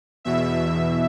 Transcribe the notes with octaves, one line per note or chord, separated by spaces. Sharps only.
E2 B2 E5